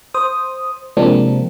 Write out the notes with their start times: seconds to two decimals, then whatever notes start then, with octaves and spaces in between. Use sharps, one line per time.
0.14 C5 D#6
0.97 C3 F3 G#3 A#3 C4 D4